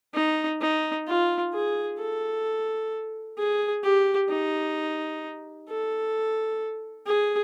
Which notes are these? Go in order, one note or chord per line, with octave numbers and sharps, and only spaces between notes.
D#4
D#4
F4
G#4
A4
G#4
G4
D#4
A4
G#4